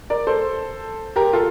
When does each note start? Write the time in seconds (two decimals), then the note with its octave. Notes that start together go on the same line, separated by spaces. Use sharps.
0.10 A#4 D5
0.27 A4 C5
1.16 G4 A#4
1.33 F4 A4